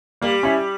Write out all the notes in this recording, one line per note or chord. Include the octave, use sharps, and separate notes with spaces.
G3 A#3
C#4 E4